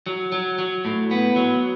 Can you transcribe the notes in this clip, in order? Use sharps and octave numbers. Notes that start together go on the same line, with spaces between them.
F#3
F#3
F#3
A2
B3
F#3